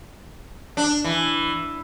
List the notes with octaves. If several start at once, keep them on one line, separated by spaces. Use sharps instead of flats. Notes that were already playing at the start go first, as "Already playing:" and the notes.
D4
E3